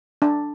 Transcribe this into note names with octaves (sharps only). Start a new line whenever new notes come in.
D4